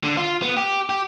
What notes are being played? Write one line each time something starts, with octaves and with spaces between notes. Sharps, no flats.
D3
F4
B3
G4
G4